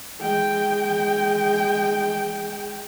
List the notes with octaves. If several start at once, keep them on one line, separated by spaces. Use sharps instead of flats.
G#3 G5